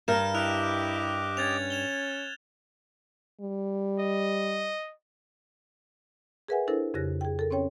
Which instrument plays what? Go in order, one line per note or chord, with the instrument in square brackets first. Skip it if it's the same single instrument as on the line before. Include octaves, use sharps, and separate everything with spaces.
[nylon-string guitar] G2 A#4 [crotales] F6 G6 E7
[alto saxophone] E4 [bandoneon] G4 D#5 D6 [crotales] F6 F#6 F7
[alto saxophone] C#4 [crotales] G#6 A6 F7
[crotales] E7 F7 G7
[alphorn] G3
[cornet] D#5
[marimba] G#4 A#4 B4 E5 F#5 G#5
D4 E4 A4 A#4 C5
F2 C#3 G4 F#6 A#6
G#4 G5
A4 A#4
C4 C#4 C#5 G5